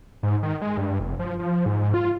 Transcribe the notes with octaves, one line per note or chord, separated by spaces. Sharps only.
G#2
D#3
G#3
G2
F1
F3
F3
G#2
F4